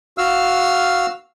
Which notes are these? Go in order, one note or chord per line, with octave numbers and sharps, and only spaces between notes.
F#4 F5 E6 F6